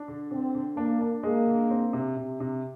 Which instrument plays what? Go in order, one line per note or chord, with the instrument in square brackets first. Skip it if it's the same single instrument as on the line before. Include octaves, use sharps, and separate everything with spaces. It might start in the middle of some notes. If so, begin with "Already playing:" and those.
Already playing: [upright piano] D4
D3
[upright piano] D3 [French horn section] C4
[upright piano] D3
[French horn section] A#3 [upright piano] D4
[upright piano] D4
[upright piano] G#3 [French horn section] A#3
[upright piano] D3
C4
C3
C3
C3